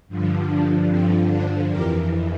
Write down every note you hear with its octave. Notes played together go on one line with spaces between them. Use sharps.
G2 D3 F3
D4
G2 D3 F3 C4
D4
F2 E3 G4 A#4